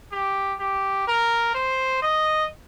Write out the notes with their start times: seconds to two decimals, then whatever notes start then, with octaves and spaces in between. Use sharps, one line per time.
0.12 G4
0.60 G4
1.07 A#4
1.54 C5
2.02 D#5